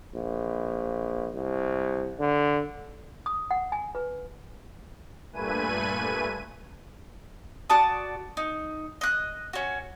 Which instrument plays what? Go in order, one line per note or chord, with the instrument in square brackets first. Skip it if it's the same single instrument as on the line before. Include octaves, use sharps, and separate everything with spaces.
[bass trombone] A#1
C2
D3
[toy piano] D#6
F#5
G#5
B4
[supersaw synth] G2 A#2 A3 B4 G#5 D#7
[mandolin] F#4 D5 A5 D#6
D#4
D#5 F#6
C#4 F#4